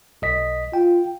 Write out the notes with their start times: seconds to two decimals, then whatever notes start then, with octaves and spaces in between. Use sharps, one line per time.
0.22 B1 D#5 B6
0.73 F4 G5